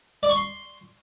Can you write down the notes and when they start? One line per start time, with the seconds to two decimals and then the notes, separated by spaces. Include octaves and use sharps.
0.23 D5
0.29 C#6
0.36 C6